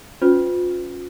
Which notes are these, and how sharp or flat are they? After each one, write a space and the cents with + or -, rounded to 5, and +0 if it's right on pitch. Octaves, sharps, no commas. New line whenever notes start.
C#4 +0 F4 +30 B4 +45